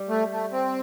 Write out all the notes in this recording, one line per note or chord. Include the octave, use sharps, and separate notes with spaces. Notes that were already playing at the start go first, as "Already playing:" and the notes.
Already playing: G3
A3
A3
C4